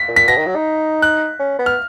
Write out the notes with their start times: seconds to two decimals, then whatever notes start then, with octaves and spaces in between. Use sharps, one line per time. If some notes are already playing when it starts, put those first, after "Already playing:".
Already playing: B6
0.08 A#2
0.16 B6
0.28 B2 A#6
0.37 D#3
0.46 F#3
0.55 D#4
1.02 F#6
1.40 C#4
1.59 B3
1.66 F6